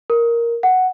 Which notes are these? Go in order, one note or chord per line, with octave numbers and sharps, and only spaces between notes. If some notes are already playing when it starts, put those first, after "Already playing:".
A#4
F#5